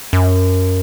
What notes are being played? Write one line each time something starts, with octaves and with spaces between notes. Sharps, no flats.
F#2